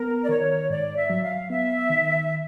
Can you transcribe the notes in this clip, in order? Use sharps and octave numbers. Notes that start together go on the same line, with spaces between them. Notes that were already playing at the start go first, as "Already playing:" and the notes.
Already playing: B3 A#4
D5
D#3 C#5
G#2 D5
E5
F#3
F5
B3 E5
D#3